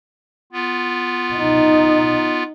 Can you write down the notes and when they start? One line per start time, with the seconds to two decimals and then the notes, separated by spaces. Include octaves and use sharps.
0.53 B3 F4
1.35 D#4